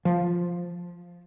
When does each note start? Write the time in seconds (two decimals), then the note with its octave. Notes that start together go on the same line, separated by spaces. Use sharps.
0.05 F3